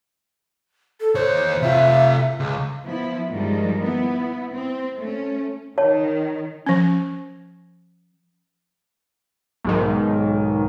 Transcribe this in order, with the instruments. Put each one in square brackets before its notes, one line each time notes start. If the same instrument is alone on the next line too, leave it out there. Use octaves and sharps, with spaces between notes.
[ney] A4
[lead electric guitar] D#2 C#5 [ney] C5
[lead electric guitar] C3 F4 [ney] E5
[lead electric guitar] C#2
[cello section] F3 B3 E4
G2 D#3 F3 G3 G#3
B3 E4
C4
A3 C#4
[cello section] D#3 [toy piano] C#5 A5
[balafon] F3 C#4
[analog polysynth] B1 G#2 D#3